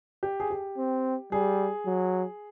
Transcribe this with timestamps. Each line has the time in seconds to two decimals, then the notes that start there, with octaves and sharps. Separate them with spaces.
0.23 G4
0.40 G#4
0.50 G4
0.78 C4
1.32 G3 G#4
1.86 F#3